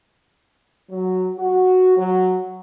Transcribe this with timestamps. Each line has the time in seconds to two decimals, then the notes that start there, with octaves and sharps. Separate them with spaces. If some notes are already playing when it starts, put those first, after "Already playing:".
0.91 F#3
1.39 F#4
1.97 F#3